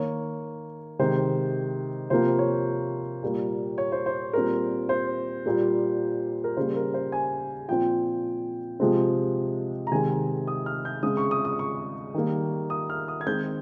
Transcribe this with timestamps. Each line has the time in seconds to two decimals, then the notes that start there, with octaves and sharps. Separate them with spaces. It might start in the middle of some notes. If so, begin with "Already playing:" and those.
Already playing: D#3 A#3 C#5
0.99 C3 D#3 G#3 C5
2.10 C3 F3 A#3 C5
2.39 C#5
3.23 A#2 G3 A#3
3.78 C#5
3.92 C5
4.06 C5
4.33 A#2 G3 C4 A#4
4.89 C5
5.46 A#2 G3 A#3
6.44 A#4
6.57 C#3 G3 A#3 C5
6.76 A#4
6.94 C5
7.12 G#5
7.68 A#2 F3 C4 G5
8.80 C3 F3 G#3 C4
9.87 A#5
9.92 C3 D#3 G#3 C4 G#5
10.47 D#6
10.66 F6
10.85 G6
11.03 C#3 G#3 C4 D#6
11.17 C#6
11.31 D#6
11.45 D#6
11.59 C#6
12.14 D#3 G3 A#3
12.70 D#6
12.90 F6
13.08 D#6
13.21 G#6
13.27 D#3 G#3 C4 G6